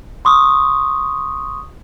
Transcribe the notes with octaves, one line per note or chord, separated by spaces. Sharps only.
C6 C#6 D#6